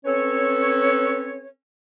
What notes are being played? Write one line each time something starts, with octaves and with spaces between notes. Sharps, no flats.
C4 C#4 A4 B4 C#5